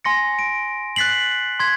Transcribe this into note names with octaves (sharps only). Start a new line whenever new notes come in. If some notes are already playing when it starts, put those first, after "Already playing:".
G#5 C6 A#6 C#7
D7
F#6 A6 B6 C7 F#7
C6 G#6 B6